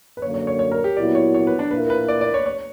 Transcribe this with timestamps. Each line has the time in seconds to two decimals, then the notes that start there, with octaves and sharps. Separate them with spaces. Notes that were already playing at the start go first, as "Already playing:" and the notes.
0.17 B4
0.22 F#2 D3 A#3 C#5
0.34 C#5
0.47 C#5
0.59 C#5
0.72 A#4
0.84 G4
0.96 A#2 F#3 B3 E4 D5
1.15 C#5
1.34 C#5
1.47 B4
1.59 D4
1.71 A#2 A#3 E4 A#4 B4
1.90 B4
2.08 D5
2.21 D5
2.34 C#5
2.46 C#5